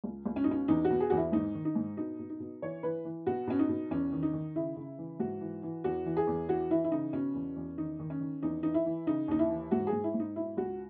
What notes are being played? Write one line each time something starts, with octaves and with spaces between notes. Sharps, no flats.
C#2
C#2
C#4
D#4
B2 C#4
E2 D#4
F#4
B2
G#4
E2 F#4
E4
G#2 D#4
D#3
D#4
G#2
B2 D#4
B2
D#4
B2
E3 C#5
E3 B4
E3
B2 F#4
B2 C#4
D#4
B2
E2 C#4
D#3
D#4
D#3
C#3 E4
C#3
E3
G#2 F#4
E3
E3
E2 F#4
E3
G#4
E2
E3 F#4
E3 E4
E4
C#3 D#4
B2 C#4
E2
E2
D#3 D#4
D#3
C#4
D#3
E2 D#4
E3 D#4
E4
E3
C#3 D#4
D#2 D#4
E4
E3
G#2 F#4
G#4
G#2
E4
G#2
D#4
B2 E4
C#2 F#4